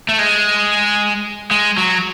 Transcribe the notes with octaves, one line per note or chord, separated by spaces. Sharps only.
A3
G#3
G#3
F#3